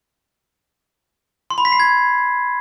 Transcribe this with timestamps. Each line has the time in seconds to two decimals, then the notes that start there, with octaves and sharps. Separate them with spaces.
1.50 C6
1.58 B5
1.65 B6
1.72 C7
1.80 G#6